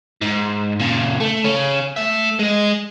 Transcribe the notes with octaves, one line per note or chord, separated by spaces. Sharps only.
G#2
A#2 C#3
A3
C#3 C#4
A3 E5
G#3 D#5